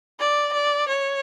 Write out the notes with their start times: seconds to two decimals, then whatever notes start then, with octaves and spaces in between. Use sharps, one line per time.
0.20 D5
0.53 D5
0.88 C#5